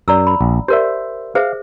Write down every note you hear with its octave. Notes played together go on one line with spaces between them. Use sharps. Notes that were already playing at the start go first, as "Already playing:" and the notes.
F#2 D5 A#5 E6
B5
A#1
G4 A#4 C5 D5 E5
G#4 C5 E5 F5